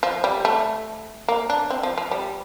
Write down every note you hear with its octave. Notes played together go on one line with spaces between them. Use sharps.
F3
G3
A3
A#3
D4
C4
F3
F3
G3